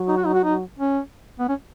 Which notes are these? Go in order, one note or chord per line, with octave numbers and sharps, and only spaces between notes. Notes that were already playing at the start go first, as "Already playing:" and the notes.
Already playing: F#3
D#4
F#4
D#4
F#4
D#4
C#4
B3
C#4